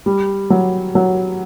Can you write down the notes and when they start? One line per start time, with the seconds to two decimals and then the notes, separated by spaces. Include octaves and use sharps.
0.06 G3
0.50 F#3
0.95 F#3